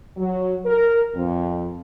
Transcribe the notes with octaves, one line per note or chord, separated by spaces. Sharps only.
F#3
A#4
F2